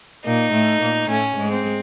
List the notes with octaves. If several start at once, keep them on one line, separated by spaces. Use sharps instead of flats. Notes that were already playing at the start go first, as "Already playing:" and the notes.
A#2 A#3 D#4
A2 A3
A#2 A#3
A2 A3 C#4
G#2 G#3
C4